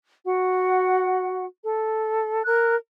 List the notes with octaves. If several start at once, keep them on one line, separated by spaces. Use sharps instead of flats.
F#4 F#5
A4
A#4 F#6